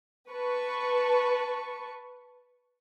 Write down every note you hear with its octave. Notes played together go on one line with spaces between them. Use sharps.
B4 A5 C#6